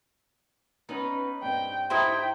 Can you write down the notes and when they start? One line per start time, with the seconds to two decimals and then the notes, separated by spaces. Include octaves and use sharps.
0.89 B3 C#4 D#4 B4
1.42 G2 C4 D#5 G5
1.90 D#4 E4 G4 C5 E5 G5 A#5